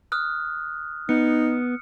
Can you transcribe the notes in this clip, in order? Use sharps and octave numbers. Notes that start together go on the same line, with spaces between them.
D#6 F6 F#6
B3 D#4 C#7